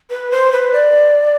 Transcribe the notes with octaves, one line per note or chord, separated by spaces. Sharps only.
B4
C5
B4
D5